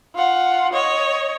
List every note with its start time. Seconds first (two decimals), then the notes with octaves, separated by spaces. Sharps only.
0.15 F4 F#5
0.73 C#5 D#5